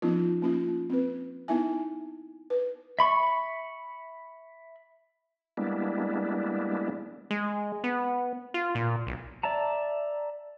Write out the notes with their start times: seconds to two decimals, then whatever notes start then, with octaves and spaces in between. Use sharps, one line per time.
0.02 F3 B3 C#4 D#4 F4
0.42 A#3 C#4 F4
0.90 C4 B4
1.48 B3 D#4 E4 E5 G#5
2.50 B4
2.99 E5 B5 C#6
5.57 G3 G#3 A#3 B3 D4 E4
7.31 G#3
7.84 B3
8.54 F4
8.75 A#2
9.07 B1
9.43 D5 E5 A5 A#5